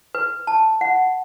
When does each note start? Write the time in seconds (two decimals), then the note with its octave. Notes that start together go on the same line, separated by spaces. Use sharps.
0.15 B4
0.47 A5
0.81 F#5